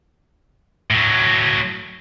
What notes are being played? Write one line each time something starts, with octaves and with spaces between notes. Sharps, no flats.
A2 F#3